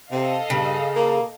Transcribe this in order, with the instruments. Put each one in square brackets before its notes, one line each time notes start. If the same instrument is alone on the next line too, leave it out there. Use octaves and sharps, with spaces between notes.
[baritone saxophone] C3 [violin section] A4 D#5 F5
[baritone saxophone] G2 [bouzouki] C#3
[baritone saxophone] A#3